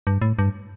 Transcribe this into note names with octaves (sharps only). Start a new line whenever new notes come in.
G2
A2
G2